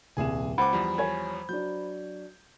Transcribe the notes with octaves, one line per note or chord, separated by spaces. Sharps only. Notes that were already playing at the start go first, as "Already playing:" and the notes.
D#1 C2 G#4 G#5 E7
C#2 C5 F#5 B5 D6
E2 F3 G3
C#5 G#5 G#6
F#3 D4 G6